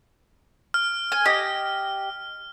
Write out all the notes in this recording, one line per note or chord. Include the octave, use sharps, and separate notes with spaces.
F6
G#5
G4 D#5 F6